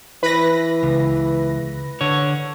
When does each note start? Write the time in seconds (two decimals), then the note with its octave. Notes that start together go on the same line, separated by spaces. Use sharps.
0.23 E3 B4 A#6
0.83 C#2
2.01 D3 C#5